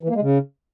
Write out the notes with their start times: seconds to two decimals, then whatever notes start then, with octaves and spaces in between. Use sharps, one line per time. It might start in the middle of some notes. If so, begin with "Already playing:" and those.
0.03 E3
0.09 A#3
0.15 G#3
0.22 C#3